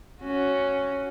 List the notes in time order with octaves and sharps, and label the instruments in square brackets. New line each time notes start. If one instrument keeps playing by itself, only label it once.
[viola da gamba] C#4 F#4